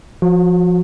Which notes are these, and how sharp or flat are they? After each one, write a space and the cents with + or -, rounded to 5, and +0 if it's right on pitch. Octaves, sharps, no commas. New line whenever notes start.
F3 +0 F#4 -30